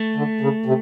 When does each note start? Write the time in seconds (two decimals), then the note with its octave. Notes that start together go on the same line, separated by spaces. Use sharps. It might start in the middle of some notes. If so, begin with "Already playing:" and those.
Already playing: A3
0.16 D3
0.41 C#3
0.66 C3